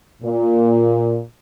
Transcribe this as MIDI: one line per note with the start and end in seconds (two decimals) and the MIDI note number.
0.23 1.19 46